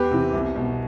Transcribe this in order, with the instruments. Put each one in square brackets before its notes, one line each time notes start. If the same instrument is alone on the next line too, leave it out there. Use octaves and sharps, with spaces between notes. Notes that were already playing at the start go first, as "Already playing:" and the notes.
Already playing: [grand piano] E2 G4 B4
C3 E3
C2
B2